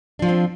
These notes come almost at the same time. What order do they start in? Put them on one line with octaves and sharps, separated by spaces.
D4 F3 F4 C4